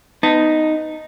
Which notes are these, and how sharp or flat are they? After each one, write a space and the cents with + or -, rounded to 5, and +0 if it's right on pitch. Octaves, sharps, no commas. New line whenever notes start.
B3 +20 D#4 +0 A5 +25